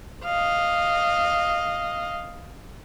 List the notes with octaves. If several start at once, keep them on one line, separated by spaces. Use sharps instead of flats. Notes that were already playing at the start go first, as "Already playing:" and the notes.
D#5 F5